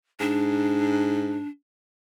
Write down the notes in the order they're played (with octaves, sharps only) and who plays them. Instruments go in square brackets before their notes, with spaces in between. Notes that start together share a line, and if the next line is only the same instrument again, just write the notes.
[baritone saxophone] G#2 [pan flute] D4